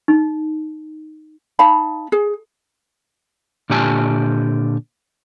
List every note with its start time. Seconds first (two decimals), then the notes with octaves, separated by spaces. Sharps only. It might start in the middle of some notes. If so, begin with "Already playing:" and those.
0.08 D#4
1.59 D#4 F5 A5 B5
2.12 G#4
3.70 A#2 D3 G4 G#5 A5